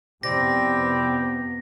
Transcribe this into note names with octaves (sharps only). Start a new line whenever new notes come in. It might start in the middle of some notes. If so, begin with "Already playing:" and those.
F2 C3 B3 C4 E4 G4 D5 A#6